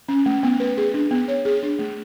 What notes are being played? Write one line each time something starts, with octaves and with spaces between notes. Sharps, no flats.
C#4
A3
B3
B4
G#4
D4
B3
C#5
G#4
D4
A3